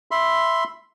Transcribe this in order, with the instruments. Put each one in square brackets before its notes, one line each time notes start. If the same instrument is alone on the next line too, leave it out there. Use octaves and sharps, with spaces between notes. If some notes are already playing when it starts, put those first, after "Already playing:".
[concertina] E5 B5 C6